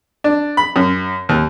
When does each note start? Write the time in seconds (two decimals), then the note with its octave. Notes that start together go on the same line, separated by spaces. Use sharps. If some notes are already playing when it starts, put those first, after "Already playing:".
0.24 D4
0.57 B5
0.76 F#2
1.29 D#2